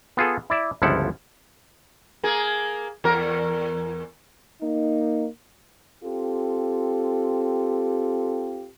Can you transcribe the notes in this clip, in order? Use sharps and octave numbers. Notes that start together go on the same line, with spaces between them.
B3 F4 G#4 A4
E4 D5 E5
G1 C#2 F3 E4 A4 F#5
A#3 G#4
E2 A#4
A#3 D#4
C4 F4 G4 A4